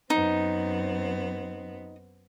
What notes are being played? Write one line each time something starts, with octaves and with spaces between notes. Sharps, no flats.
F#2 B3 C4 D#4